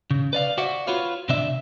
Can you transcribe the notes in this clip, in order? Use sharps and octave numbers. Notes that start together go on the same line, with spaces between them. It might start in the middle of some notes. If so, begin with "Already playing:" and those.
C#3
B4 D5 F5
F#4 C5 D5 E5 F#5
F4 F#4 B4 C#5 F5
C3 C4 D4 E5